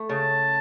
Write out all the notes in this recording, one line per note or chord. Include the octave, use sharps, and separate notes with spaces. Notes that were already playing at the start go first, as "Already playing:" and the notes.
Already playing: A3
C#3 A5